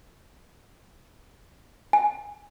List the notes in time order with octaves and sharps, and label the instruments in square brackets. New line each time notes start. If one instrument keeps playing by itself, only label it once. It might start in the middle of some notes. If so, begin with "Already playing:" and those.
[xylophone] G#5